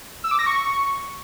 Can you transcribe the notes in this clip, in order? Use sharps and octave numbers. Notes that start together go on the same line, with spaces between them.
E6
D6
A#6
C#6